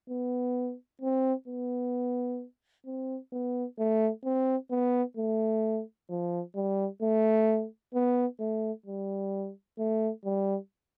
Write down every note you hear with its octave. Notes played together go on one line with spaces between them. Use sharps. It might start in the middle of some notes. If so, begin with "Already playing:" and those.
B3
C4
B3
C4
B3
A3
C4
B3
A3
F3
G3
A3
B3
A3
G3
A3
G3